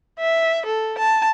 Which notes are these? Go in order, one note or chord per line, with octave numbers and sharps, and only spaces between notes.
E5
A4
A5